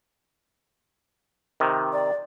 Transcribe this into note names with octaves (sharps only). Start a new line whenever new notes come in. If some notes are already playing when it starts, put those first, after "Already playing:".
C3 D#3
D5